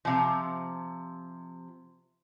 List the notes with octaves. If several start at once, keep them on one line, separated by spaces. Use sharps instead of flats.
C3 F3